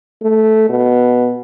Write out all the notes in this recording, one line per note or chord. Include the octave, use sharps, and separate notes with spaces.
A3
B2